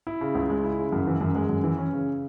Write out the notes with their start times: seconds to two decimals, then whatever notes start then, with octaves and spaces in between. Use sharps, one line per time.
0.07 E4
0.21 C#3
0.35 C#2
0.50 G#3
0.64 E4
0.79 C#3
0.92 F#2
1.07 E3
1.21 F#2
1.35 G#3
1.49 F#2
1.64 E3
1.78 C#4
1.93 C#3